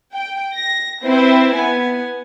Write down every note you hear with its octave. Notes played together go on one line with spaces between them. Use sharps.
G5
A#6
C4 E4 B4 C5
B3 G#5